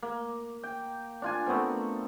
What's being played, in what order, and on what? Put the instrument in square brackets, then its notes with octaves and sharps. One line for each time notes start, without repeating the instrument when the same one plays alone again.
[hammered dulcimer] A#3
G5
D4 F4 G#5
A3 B3 C4 A#4